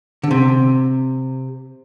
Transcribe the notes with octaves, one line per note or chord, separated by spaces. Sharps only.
D3
C3